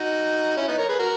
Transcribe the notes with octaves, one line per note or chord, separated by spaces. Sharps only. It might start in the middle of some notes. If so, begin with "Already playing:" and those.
Already playing: D#4 F#4
C#4 E4
B3 D#4
A#4 C#5
G#4 B4
F#4 A#4